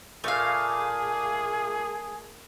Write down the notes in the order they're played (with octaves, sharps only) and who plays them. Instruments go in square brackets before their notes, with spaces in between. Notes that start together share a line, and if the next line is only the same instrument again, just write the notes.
[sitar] A#2 [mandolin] A3 F5 [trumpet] G#4